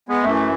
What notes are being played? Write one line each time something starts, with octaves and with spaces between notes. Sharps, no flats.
G#3 B3
F#2 E3 A3